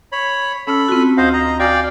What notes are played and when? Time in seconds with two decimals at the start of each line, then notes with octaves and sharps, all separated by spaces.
0.12 C#5 B5
0.67 C#4 A4 B5 F6
0.89 C4 F4 F#4
1.18 D2 C5 D#5 F5
1.33 D#5 A#5
1.60 F#4 D5 F5 G5 G#5 F6